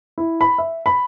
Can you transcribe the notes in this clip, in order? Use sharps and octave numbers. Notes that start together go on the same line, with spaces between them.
E4
B5
E5
B5